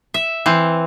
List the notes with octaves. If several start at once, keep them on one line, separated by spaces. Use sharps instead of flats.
E5
E3 C4